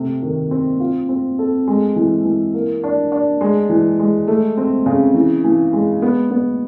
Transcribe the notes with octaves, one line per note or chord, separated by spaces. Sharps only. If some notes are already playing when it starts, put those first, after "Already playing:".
Already playing: C3 A3
D#3
C4
F4
C4
A4
G#3
E3
E3
A#3
D4
D4
G#3
E3
G#3
A3
C4
C#3
E3
E3
G#3
B3
B3